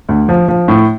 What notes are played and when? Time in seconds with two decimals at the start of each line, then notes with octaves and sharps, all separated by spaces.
0.09 D2
0.29 F3
0.48 F3
0.68 A2